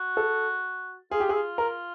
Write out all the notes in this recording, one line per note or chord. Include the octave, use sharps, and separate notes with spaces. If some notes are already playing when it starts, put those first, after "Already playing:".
Already playing: F#4
A4
F4 G#4
G4
E4 G#4
F4
A#4